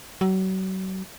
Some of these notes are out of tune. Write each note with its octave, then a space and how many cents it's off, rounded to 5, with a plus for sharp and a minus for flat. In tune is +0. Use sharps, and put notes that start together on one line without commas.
F#3 +35